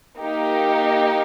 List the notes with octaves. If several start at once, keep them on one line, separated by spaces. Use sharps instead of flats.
A#3 D#4 G4 A#4